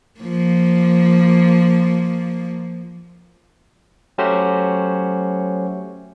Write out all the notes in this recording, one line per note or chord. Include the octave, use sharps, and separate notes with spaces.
F3 A#3
F#3 A3 C#4 F#4 G4 C5